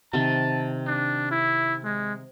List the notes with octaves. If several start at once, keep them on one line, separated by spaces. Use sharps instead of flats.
C3 D#3 A5
D4
E4
G#3